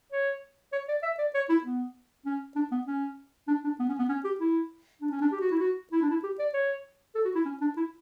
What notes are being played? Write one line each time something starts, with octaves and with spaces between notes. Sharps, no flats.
C#5
C#5
D5
E5
D5
C#5
E4
B3
C#4
D4
B3
C#4
D4
D4
B3
C#4
B3
C#4
G4
E4
D4
C#4
D4
G4
F#4
E4
F#4
E4
D4
E4
G4
D5
C#5
A4
F#4
E4
C#4
D4
E4